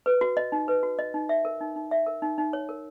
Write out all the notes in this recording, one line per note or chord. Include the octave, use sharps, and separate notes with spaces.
B4
F#4
D#5
D#4
B4
F#4
D#5
D#4
E5
A#4
D#4
D#4
E5
A#4
D#4
D#4
C#5
A#4